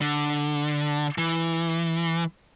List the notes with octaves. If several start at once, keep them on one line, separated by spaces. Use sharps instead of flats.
D3
E3